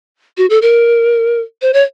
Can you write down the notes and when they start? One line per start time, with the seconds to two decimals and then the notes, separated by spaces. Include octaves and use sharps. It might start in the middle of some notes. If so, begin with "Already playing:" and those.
0.37 F#4
0.50 A4
0.62 A#4
1.62 C5
1.73 C#5